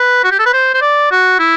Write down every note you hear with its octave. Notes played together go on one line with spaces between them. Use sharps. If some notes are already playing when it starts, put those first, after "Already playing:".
Already playing: B4
F#4
G4
A4
B4
C5
C5
D5
F#4
E4